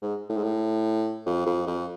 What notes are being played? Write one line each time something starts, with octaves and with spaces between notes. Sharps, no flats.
G#2
A2
G#2
A2
F2
F2
F2